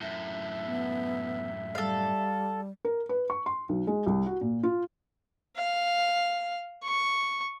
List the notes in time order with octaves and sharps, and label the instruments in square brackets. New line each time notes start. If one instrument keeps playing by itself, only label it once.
[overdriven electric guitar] F#2 A2 [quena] E5
[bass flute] B3
[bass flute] G3 [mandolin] A4 F5
[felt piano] A#4
B4
C#6
C6
B1
G#3
C2
F#4
A#2
F4
[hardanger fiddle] F5
C#6